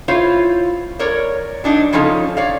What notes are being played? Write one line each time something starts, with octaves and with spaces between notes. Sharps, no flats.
E4 F4 C5 C#5 F5
A#4 C#5 D5
F#3 D4 D#4
C#3 F3 C#4 D#4 A4
C#5 D5 F5